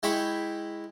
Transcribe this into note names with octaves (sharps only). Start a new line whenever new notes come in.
G#3 E4 G5 B5 C#6